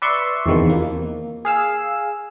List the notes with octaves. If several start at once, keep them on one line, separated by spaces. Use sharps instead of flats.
B4 D5 E5 C6 C#6
E2 C3 D#3 F3
A#3
G#4 F5 E6